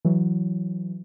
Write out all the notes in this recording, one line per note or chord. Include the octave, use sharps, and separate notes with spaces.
E3 F#3